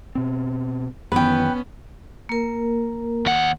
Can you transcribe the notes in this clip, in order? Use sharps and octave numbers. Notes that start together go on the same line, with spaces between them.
B2 C4
F#2 D#3 E3 B3 C#4 B4 G5
A#3 A#4
D#2 F#5